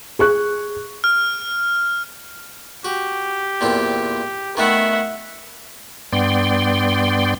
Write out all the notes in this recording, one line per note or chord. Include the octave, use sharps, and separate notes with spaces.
G#4 C#6 F#6
F6
F#4 G4
E2 A#2 C4
D#3 A3 B3 E5 F#5
G2 B3 D5 G5 C6